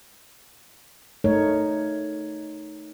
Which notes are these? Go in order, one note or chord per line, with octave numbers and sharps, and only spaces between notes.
A3 D#4 A#4 C#5